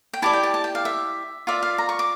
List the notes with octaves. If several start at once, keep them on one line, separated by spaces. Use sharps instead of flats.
G5
E4 G4 D5 A5
G5
A5
A5
G5
F5
E5
F4 A#4 D5 E5
F5
A#5
C#6
D6